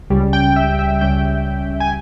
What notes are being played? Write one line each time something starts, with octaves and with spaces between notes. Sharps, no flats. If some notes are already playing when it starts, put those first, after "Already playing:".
C#2 C#3 G3 C#4
G5
E5
E5
C#2 C#3 G3 C#4 G5
G#5